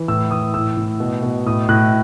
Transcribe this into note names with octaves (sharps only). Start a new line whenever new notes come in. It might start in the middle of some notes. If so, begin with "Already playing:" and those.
Already playing: E3
A2 E6
E3 D#6
A2 E6
A2
B2
B2
A2 D#6
A2 F#6